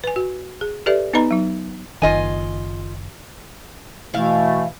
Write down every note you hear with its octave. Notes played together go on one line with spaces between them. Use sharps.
B4 G#5
F#4
G#4
G4 A4 B4 D5 E5
B3 D#4 B4 D#5 A#5 B5
F#3 D#4
F#1 D#3 F4 D#5 G#5
B2 E3 A3 E4 F5